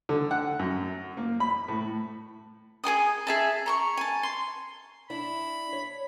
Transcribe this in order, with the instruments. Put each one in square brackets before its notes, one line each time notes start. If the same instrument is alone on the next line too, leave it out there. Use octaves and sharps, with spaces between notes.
[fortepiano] D3
F#5
F#2
A#3
B5
A2
[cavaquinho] G#4 A4 G#5 D#6
G#4 E5 A5
A#5 C6 C#6
G#5 A5
C6
[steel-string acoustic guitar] D4 E4 [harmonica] B5
[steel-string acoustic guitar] C#5